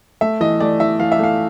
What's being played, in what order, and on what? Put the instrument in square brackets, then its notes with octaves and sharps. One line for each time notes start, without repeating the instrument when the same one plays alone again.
[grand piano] A3 [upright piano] E5
[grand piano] E3 [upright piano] D#5
[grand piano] A3 [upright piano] D5
[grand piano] E3 [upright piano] E5
[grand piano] E3 [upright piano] F5
[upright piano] E5
[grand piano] A3 [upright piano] F5